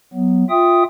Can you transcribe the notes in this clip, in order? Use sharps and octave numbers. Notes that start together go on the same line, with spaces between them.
F#3 B3
F4 E5 G5 D#6